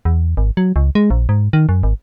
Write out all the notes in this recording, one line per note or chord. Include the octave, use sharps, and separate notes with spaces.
E2
G#1
F#3
C#2
G#3
A#1
G#2
D#3
F#2
G#1